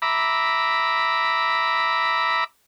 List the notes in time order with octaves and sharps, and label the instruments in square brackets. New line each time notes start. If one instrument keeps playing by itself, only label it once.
[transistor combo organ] E5 A#5 B5 D6